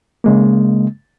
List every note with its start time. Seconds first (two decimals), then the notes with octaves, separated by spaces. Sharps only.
0.24 C#3 G#3 A#3